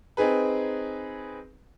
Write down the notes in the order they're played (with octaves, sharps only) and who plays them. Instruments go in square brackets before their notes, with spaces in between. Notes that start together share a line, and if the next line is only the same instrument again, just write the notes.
[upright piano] C4 D#4 G#4 B4